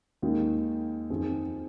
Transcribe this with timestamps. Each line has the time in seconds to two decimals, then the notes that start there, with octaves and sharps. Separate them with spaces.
0.22 D#2 D#3 G#3
1.10 F2 D#3 C4 G#4